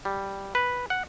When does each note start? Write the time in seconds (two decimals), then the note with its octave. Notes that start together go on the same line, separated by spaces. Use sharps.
0.05 G3
0.55 B4
0.90 F#5